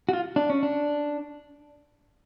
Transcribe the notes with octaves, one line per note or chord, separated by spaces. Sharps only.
F#4
F4
D4
C#4
D4